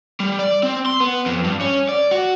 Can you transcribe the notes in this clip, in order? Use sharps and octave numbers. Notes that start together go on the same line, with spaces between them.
G3
D5
C4
C6
B3
F2
G2
C#4
D5
F#4